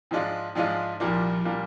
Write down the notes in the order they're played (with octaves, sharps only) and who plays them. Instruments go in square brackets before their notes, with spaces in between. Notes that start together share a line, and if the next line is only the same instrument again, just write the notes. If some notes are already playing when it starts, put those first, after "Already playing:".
[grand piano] G#2 F3 G#3 D4 F4
G#2 F3 G#3 D4 F4
[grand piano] C2 A#2 G3 A#3 D4 [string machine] F3
[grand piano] A#2 G3 A#3 D4